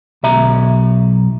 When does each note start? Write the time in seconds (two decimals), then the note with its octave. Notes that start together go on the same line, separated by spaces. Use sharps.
0.23 B1 E5 A#5